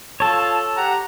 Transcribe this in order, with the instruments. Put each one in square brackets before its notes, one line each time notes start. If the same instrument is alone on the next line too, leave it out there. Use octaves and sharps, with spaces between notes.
[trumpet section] F4 A5 [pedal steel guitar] A4 C#5
[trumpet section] G4 F#5 A#5